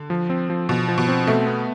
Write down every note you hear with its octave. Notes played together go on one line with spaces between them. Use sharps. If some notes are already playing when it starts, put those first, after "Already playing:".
Already playing: D3
F3
C4
F3
B2 F3
F3
B2
C4
B2 A3
B3